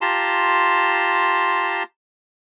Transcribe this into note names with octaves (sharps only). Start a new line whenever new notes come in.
F4 G4 A5 A#5 C6